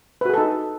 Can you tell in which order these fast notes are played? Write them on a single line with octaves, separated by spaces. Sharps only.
B4 F#4 G#4 A4 D#4